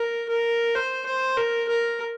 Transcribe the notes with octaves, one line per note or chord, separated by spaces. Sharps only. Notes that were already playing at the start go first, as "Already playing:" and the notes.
Already playing: A#4
A#4
C5
C5
A#4
A#4